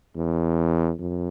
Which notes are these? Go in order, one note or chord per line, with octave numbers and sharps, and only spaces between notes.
E2
F2